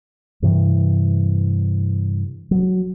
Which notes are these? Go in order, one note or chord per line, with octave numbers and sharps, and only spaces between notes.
G2 C3 E3
F#3